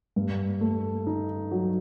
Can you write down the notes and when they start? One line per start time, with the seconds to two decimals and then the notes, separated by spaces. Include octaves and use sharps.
0.16 G2
0.61 A3
1.07 D#4
1.51 F#3